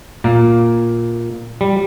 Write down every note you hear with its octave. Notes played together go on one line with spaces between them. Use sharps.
A#2 A#3
G3